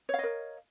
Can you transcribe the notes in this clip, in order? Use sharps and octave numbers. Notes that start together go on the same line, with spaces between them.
A#4 C#5 D#5 F5